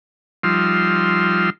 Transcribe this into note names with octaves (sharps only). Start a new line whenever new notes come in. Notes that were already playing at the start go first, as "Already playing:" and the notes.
F3 G3 D#4 F4 C6 E6